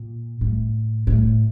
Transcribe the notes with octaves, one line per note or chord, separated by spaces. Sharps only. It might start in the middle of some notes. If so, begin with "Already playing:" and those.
Already playing: A#2
A2
A2